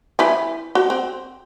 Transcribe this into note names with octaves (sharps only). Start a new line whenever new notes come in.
E4 B4 G#5
F#4
C4